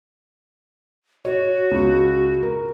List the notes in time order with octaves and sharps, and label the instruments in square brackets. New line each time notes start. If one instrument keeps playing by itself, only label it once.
[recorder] F#4 [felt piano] C#5
[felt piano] C#2
A#4